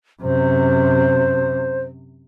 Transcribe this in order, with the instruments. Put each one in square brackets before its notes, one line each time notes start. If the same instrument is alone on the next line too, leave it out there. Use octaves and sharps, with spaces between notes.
[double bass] F#2 C3 [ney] C5